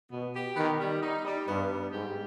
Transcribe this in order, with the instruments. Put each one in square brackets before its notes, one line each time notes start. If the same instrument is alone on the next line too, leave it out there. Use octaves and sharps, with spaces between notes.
[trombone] B2 [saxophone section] B3
[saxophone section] G4
[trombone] D#3 [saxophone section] B3
[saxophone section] G3
D#4
G3
[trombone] G2 [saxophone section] B3
[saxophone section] G3
[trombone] G#2 [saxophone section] G4